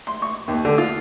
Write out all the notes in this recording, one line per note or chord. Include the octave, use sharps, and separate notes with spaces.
C6
C#6
D#2
D3
F4